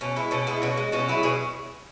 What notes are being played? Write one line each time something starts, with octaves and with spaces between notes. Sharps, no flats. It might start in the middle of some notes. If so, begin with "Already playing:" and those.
B2 C#4
G#3 B3 E4
B2 C#4
G#3 B3 E4
B2 C#4 F#4
G#3
B2 C#4 F#4
F#3 E4 G#4
B2 G#4 C#5